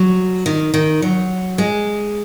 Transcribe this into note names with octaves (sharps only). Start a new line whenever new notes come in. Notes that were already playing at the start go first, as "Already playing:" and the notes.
Already playing: F#3
D#3
D#3
F#3
G#3